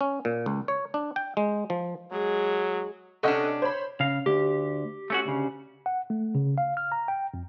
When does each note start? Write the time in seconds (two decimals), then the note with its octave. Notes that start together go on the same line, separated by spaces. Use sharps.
0.01 C#4
0.25 A#2
0.46 C#2
0.68 C#5
0.94 D4
1.16 G5
1.37 G#3
1.70 F3
2.11 F#3 G#3 G#4
3.23 C3 C#4 D4 A4 D#5 F#5 C#6
3.62 C5 C#5 B5
4.00 C#3 F5
4.26 D2 G4
5.10 A3 C#4 F#4
5.25 D2 C#3
5.86 F#5
6.10 A3
6.35 C#3
6.58 F5
6.77 F6
6.92 A#5
7.08 G5
7.34 F2